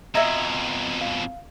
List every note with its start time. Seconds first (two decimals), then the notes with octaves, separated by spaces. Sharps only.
0.15 F2 B2 D#5 E5 A#5 G#6
1.01 F5